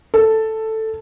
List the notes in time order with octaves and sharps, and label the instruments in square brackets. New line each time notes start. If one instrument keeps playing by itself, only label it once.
[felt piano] A4